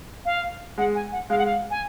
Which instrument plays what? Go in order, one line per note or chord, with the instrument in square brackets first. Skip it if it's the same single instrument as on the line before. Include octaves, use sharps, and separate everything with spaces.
[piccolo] F5
[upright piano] G#3 [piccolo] F#5
[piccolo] G#5
F#5
[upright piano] G#3 [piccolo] F5
[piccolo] F#5
F5
G#5